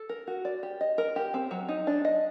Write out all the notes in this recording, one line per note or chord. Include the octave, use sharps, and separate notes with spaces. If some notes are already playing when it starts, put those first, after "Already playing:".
Already playing: A4
A#4
F#4
D5
G4
D#5
A#4
G4
C4
F#3
D#4
D4
D#5